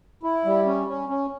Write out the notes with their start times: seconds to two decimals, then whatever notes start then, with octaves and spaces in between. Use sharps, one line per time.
0.23 E4
0.45 G3
0.66 C#4
0.87 C#4
1.09 C#4